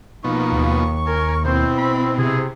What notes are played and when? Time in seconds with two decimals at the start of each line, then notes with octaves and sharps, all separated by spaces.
0.24 B2 F3 A#3 B3 D#4 C#6
0.52 D#2
1.07 A#4 G#5
1.45 B2 C4 E4 C5
1.78 B5
2.18 C3 G#4